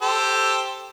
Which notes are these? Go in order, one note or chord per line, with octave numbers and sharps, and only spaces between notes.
G4 A4 C5